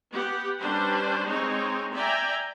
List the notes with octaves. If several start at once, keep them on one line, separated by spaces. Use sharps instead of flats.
B3 G4 F#5
G3 C#4 D4 B4 C5
G#3 C4 D#4 C#5
D5 E5 G5 G#5 A#5